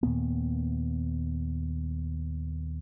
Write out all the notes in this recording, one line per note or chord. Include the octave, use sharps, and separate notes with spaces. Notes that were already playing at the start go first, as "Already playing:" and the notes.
D#2 A#2 A#3 B3